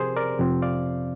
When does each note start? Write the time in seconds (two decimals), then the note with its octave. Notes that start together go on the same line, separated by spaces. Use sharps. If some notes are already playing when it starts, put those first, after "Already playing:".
Already playing: C3 F3 C4 G4 G#4 A#4 C5
0.16 A#4 D5
0.39 F2 C3 F3 C4
0.62 D5 F5